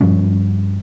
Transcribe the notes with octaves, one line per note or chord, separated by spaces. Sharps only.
G2 F3 G3 C#4